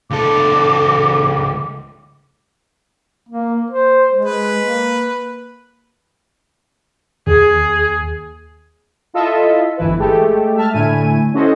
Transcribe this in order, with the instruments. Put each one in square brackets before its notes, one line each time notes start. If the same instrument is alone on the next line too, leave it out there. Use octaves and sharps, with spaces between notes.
[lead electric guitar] C#2 A4 [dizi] D6
[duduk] A#3
C5
G#3
[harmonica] B4
[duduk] A#3
[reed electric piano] D#2 [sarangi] G#4
[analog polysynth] E4 F4 A4 D#5 E5
G1 E3 E4 B4
G#3 A3 G4 A4
E5 A5 F6
A2 D3 A3 E4 G#5 D#7
C#4 E4 F#4 A4 C5 D#5